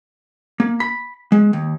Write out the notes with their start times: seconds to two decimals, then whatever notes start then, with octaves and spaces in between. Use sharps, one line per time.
0.60 A#3
0.80 B5
1.32 G#3
1.53 D#2